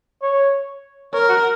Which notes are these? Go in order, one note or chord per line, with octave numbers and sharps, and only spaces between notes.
C#5
A#4 C#5
F#4